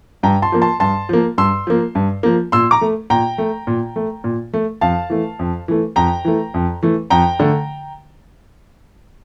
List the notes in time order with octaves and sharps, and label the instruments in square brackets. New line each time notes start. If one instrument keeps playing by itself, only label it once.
[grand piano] G2 G5 A#5
A5 C6
F3 A#3
A5 C6
G2 A5 C6
F3 A#3
G2 C6 E6
F3 A#3
G2
F3 A#3
A#2 C6 E6
A#5 D6
A3
A#2 G5 A#5
A3
A#2
A3
A#2
A3
F2 F5 A5
E3 A3
F2
E3 A3
F2 G5 A#5
E3 A3
F2
E3 A3
F2 G5 A#5
D3 A3